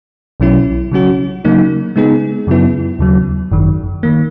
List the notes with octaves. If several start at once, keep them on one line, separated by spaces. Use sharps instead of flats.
B1 B2 F#3 C#4 E4
C#3 F#3 C#4 F#4
C#3 F#3 A#3 D#4
C#3 G#3 B3 D#4 G#4
F#2 C#3 F#3 B3 E4
D#2 C#3 F#3
G#1 F#2 D#3
D#3 A#3